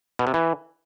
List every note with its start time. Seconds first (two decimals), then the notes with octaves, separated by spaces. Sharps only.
0.19 B2
0.27 C3
0.34 E3